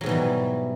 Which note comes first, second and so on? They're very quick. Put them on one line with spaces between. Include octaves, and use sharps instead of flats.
F#3 G#2 B2 E3 G3